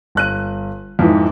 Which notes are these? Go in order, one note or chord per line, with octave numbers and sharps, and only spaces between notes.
G1 F#6 D#7
F2 G#2 E3